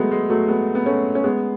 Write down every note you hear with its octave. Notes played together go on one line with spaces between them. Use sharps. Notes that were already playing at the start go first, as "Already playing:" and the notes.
Already playing: F#3 G#3 A3 B3
G#3
F#3 A3
G#3 B3
B3
A3 C#4
C#4
G#3 B3